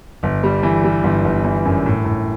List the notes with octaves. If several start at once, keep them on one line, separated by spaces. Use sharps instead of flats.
G1
G3
E3
G3
G1
G1
E3
F#2
A2
A2